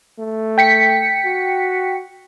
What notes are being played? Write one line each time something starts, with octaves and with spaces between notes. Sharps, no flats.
A3
G5 B6 C#7
F#4